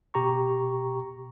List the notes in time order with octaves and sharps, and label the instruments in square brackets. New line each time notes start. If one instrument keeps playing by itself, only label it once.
[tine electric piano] B2 G4 A#5 C#6